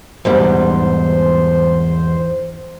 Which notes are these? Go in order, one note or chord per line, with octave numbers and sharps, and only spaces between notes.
E2 G#2 G3 C5